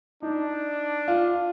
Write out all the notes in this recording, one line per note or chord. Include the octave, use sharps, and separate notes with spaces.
D4 D#4
F4